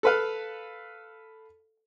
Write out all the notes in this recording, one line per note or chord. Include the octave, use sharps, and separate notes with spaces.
A4 B4 F5